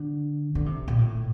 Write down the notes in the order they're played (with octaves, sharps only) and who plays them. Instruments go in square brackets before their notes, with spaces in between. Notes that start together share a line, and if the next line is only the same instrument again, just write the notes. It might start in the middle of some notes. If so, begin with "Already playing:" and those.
Already playing: [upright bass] D3
D3
C3
A#2
A2